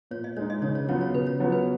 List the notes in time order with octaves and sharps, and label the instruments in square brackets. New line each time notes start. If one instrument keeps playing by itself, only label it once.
[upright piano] A#2 [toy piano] C#5
[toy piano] D#5
[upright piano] G#3 D#4 [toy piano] C#5
[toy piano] D#5
[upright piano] C#3 [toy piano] C#5
[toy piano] C#5
[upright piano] F#3 B3 F4 [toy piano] C#5
[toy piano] C#5
[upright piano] C#3 [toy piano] B4
[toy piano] C#5
[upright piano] F#3 B3 F4
[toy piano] B4